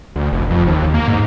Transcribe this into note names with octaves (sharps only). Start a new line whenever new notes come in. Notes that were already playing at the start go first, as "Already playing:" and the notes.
D2
F1
F2
D#2
A#3
G#2